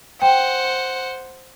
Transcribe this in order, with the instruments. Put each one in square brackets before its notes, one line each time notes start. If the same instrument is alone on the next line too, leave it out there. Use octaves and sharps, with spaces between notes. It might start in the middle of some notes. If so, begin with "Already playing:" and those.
[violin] C5 F#5 [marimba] G5